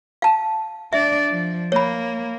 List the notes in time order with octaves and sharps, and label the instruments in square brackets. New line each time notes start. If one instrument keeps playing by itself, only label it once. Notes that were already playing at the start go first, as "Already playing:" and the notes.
[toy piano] F5 A5
[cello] D4 D5 [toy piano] E5
[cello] F3
[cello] A#3 [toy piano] C#5 B5